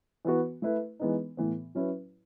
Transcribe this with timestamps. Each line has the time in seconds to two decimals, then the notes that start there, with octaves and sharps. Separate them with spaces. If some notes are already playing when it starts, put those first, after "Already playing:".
0.25 E3 B3 F#4
0.62 A3 E4 B4
1.00 E3 G#3 B3 D#4
1.37 A2 E3 B3
1.75 F#3 C#4 E4 B4